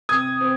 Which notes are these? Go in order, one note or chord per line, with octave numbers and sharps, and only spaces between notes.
C3 D#6 G#6
C4